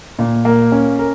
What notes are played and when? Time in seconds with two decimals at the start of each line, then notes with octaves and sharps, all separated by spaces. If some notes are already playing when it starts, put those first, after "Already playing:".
0.19 A#2
0.45 A#3
0.72 C#4
0.99 A#4